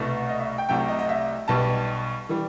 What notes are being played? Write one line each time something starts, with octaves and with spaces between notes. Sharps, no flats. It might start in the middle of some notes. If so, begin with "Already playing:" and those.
Already playing: C2 B2 A3
D#5
E5
G5
C2 C3 F#3 A3 G5
D#5
D#5
E5
B1 B2 G3 A5
E3 G3